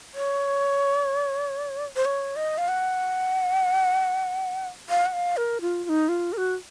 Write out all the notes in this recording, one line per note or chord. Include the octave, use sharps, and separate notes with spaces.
C#5
C5
C#5
D#5
F5
F#5
F5
F#5
F5
A#4
F4
F4
D#4
F4
A#4
F#4